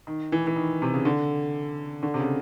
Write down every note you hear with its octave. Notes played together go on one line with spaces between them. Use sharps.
D#3
E3
E3
D#3
C3
C#3
D3
D3
C3
C#3